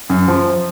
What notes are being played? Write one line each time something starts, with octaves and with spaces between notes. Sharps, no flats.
F#2
F3